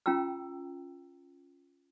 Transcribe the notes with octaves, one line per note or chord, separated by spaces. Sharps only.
C#4 F4 G5 A#5 E6